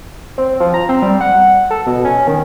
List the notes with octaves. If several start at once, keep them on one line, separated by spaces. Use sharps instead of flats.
C4
F3
A#5
C4
G3
F#5
A4
B2
C#4
D#3